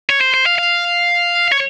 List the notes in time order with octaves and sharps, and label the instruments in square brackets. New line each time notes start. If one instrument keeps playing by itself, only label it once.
[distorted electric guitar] C#5
C5
C5
F5
F5
C#5